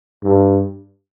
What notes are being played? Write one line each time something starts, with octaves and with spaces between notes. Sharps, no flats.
G2